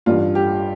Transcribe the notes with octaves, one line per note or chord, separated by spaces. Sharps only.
A1 G2 G3 F4
G4